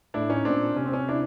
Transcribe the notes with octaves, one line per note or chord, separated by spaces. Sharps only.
A2 D4 E4
C#4 D#4
A#2 C4 D4
C3 C#4
C4
C#4
D4 E4